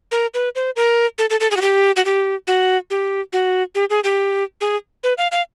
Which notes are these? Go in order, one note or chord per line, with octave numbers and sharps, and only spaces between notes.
A#4
B4
C5
A#4
A4
A4
A4
G#4
F#4
G4
F#4
G4
F#4
G4
F#4
G4
G#4
G4
G#4
B4
F5
F5